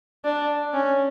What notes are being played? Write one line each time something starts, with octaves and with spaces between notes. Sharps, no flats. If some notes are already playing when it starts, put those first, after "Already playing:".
D4
C#4